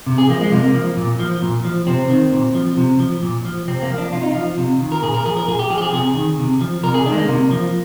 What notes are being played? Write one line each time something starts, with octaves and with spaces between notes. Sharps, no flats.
C3
G#4
F3 A#3
G#3
C3 A#3
F3
A#2
F3
A#2
F3
C3 C4
D#3
A#2
F3
C3
F3
A#2
F3
C3 C4
A#3
F3
D4
C3 F4
D#4
F3 F4
C3
D#3
A#4
A#2 G#4
A#4
F3 G#4
A#4
A#2 G#4
G4
F3 G#4
G4
G#4
C3 G#4
D#3
C3
F3
C3 A#4
G#4
D#3 D4
G#3
A#3
C3
F3